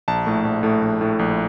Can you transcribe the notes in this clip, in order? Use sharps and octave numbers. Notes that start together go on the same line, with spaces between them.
A#1 A5
A2 A3
A#1
A2 A3
A#1
A2 A3
A#1